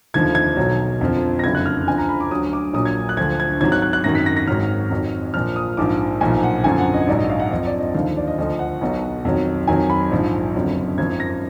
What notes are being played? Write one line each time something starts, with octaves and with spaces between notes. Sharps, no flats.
F1 D#2 D3 F3 G#6
G#6
B1 B2 F#3
F2 D3 F3
A#6
F#1 F2 D3 F#3 G#6
F#6
F6
D2 D3 F3 G#5
A#5
B5
D6
D2 D3 F#3 D#6
D6
A#1 A#2 F#3 D#6
G#6
F#6
D2 D3 F3 G#6
G#6
G#1 G#2 F#3 G#6
F#6
F#6
F#6
G#1 F#2 D#3 F#3 A#6
B6
A#6
A#6
G#1 G#2 D#3 F#3 F6
F2 D#3 F#3
A#1 A#2 F3 F6
D#6
A#1 G#2 F3 D6
B1 A#2 F3 G#5
F#5
G#1 F#2 D3 F3 G#5
F#5
D#5
A#1 G#2 F#3 D5
D#5
F5
F#5
F2 F3 D#5
D5
D#5
D#2 D3 F3 F5
D5
D#5
D2 D3 F3 D#5
F#5
B1 B2 F#3
F2 D#3 F#3
F2 D#3 F#3 G#5
B5
A#1 G#2 F3
F#1 F2 D3 F#3
G#1 F#2 F3 G#6
A#6